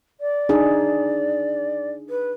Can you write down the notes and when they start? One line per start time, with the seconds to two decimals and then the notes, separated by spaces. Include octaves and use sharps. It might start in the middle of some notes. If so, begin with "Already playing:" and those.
0.20 D5
0.49 D4 D#4 G#4
2.10 B4